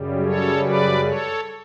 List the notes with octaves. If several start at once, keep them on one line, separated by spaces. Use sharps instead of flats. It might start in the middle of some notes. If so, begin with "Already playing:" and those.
Already playing: F#2 C#3 G3
A4 C#5
B4 D5
A4 C#5